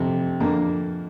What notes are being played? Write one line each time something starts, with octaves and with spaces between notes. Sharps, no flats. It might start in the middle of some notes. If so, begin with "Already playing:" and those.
Already playing: F2 C3
F2 D3 A#3